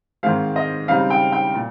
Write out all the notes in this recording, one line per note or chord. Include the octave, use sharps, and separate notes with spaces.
G#2 D#3 G#3 C4 F5
D#5
C#3 G3 C4 D#4 F5
G5
G5
A#2